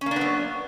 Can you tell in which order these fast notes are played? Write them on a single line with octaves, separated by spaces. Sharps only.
C#4 A#3 D4 B3 F#3